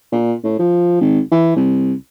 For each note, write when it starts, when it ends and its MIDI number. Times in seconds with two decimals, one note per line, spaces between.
0.12 0.34 46
0.44 0.59 45
0.59 0.98 53
1.01 1.20 32
1.32 1.54 52
1.56 1.93 36